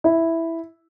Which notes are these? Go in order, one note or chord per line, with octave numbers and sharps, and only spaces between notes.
E4